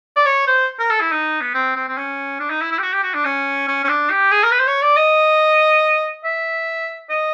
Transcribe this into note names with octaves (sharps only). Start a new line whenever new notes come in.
D5
C#5
C5
A#4
A4
E4
D#4
B3
C4
C4
C4
C#4
D4
D#4
E4
E4
G4
F#4
G4
F#4
D4
C#4
C#4
C#4
D4
G4
G#4
A#4
B4
C5
C#5
D5
D#5
E5
D#5